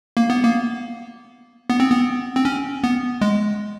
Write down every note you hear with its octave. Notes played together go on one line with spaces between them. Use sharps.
A#3
B3
A#3
B3
C4
B3
C4
C#4
B3
G#3